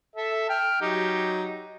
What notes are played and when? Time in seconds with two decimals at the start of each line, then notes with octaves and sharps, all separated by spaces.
0.16 A4 E5
0.50 G5 F6
0.81 F#3 D#4 G4